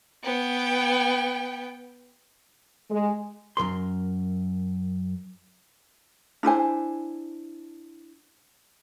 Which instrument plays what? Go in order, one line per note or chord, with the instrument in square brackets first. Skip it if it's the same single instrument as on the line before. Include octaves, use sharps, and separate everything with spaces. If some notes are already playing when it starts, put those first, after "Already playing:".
[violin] B3 G5
[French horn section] G#3
[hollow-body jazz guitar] F#2 C3 A#4 C6
[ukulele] D4 E4 C5 G#5